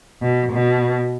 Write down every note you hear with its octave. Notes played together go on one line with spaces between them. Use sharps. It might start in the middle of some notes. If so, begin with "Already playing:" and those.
B2
B2